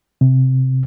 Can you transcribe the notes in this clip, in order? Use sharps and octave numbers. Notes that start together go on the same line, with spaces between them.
C3